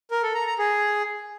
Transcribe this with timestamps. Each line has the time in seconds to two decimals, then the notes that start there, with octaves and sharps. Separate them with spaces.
0.11 A#4
0.23 A4
0.35 A#5
0.47 A#5
0.58 G#4